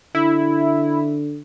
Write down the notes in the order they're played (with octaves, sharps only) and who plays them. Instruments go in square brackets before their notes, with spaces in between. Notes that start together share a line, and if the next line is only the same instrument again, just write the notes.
[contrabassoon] D3 [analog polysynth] E4